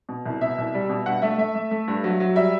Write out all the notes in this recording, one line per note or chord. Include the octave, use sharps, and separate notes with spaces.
B2
C2
B2 E5
C2
G3
B2
G2 F#5
A3 E5
A3 E5
A3
A3
G2
F#3
F#3
G3 E5